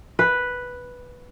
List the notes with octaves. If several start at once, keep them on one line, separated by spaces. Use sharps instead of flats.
B4